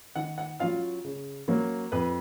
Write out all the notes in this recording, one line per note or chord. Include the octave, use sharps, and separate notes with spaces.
D#3 F#5
F#5
F#3 C#4 F4 F5
C#3
F#3 A#3 C#4
F2 B4